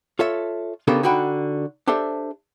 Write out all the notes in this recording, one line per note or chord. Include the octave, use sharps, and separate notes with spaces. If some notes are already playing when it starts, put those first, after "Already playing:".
F4 A4 C#5 E5
C#3 B3 D4 G4 A4 A#4
D3 D#4 F#4 G5 B5
D4 G4 A4 C5 E5